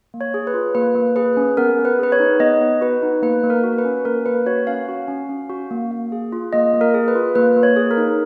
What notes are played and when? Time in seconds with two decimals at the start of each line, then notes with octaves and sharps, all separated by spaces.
0.14 A#3
0.21 C#5
0.34 G#4
0.47 B4
0.54 F4
0.75 A#3 B4
0.95 A#3
1.16 G#4 B4
1.37 C#4
1.57 B3 A#4
1.79 B3
1.85 B4
1.99 G#4 B4
2.12 C#5
2.20 D#4
2.40 B3 D#5
2.61 B3
2.81 F#4 B4
3.02 D#4
3.22 A#3 B4
3.44 A#3
3.50 A#4
3.64 F#4
3.78 B4
3.85 C#4
4.05 A#3 A#4
4.26 A#3 B4
4.46 F#4 C#5
4.67 C#4 F5
4.89 F#4
5.08 C#4
5.29 C#4
5.50 F#4
5.71 A#3
5.91 A#3
6.12 G#4
6.32 F4
6.53 A#3 D#5
6.74 A#3
6.81 A#4
6.94 G#4
7.08 B4
7.15 F4
7.35 A#3 B4
7.56 A#3
7.63 C#5
7.76 G#4
7.91 A#4
7.98 D#4